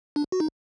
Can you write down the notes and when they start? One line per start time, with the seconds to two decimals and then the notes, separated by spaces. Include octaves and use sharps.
0.16 D4
0.32 F#4
0.40 D#4